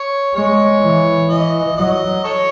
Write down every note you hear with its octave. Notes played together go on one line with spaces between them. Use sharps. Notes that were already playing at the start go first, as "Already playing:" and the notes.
Already playing: C#5
G#3 C#5
E3
E3 D#5
F#3 D#5
A4 C#5